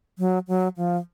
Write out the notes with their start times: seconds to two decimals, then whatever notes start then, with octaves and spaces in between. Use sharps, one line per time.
0.19 F#3
0.48 F#3
0.77 F3